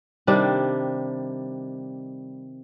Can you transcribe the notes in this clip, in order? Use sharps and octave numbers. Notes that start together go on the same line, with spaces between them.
C3 D#3 G3 D4